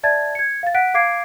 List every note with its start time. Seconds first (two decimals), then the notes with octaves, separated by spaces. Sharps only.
0.03 D5 E5 A5 G#6 A6
0.35 G#6 C#7
0.63 F5 A6
0.74 F#5 F#6 B6 D7
0.94 F5 D6 G#6 C7 D7